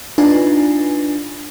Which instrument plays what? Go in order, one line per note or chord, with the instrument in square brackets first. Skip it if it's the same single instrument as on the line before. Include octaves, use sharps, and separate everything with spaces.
[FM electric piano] D4 D#4 F4 B4 G#5